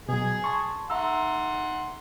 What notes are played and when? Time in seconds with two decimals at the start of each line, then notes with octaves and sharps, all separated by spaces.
0.09 B2 F#3 G#4 G#5
0.44 A5 C6 C#6
0.90 E5 F#5 A#5 C6 E6